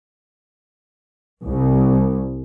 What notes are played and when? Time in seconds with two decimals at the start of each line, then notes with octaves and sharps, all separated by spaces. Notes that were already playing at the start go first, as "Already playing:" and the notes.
1.43 C2